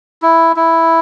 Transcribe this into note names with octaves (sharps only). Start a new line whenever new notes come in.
E4
E4